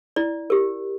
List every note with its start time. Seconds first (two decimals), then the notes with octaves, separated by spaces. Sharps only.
0.16 E4 D5
0.50 G4 A#4